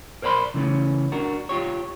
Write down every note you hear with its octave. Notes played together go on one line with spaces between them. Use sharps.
A#4 C5 D5 F#5 B5 C6
C#3 E3 A3 C#4
D4 F#4 A#4
F4 G4 C#5